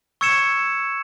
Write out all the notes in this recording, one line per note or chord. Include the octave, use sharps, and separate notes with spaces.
C#6 E6 G#6 C#7 E7